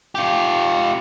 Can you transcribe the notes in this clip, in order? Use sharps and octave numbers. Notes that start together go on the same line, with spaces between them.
F4 G4